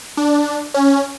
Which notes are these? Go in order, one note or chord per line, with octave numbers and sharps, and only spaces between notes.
D4
C#4